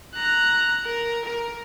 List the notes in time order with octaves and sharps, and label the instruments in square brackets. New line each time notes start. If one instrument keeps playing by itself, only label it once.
[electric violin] A#5 F#6
A#4
A#4